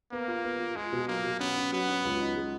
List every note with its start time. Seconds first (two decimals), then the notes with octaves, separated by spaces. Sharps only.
0.12 A#3 B3
0.28 F4
0.44 B3
0.60 F4
0.76 G#3 F4
0.93 B2
1.08 F#3 A#3
1.24 B2
1.40 B3 C#4
1.57 C#4
1.72 F#3 B3
1.89 C#4
2.05 C#2
2.21 D#4
2.36 G#3